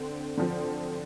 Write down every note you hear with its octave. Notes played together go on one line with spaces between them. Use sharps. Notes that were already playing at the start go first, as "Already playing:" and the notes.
Already playing: D3 C4
D3 F3 C4